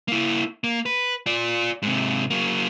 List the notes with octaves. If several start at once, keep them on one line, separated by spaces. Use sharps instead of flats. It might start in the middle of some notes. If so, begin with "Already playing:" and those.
A#3 E4
A#3
B4
F4 D5
G#2 C3
F#3 A#3